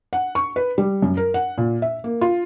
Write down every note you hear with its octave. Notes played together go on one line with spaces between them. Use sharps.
F#5
C#6
B4
G3
F#2
A#4
F#5
A#2
E5
A#3
F4